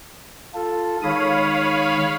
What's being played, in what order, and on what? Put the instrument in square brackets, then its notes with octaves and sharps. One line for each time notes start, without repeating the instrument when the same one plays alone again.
[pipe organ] F4 A4
[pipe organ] D#3 G#3 D#6 [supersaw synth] C#5 F5 B5